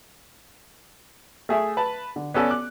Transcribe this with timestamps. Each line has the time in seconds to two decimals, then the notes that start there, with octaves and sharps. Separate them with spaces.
1.49 A3 G#4 E5
1.77 B4 A5
2.16 D3
2.34 B3 C#4 A4 B4 D5
2.50 D6 F#6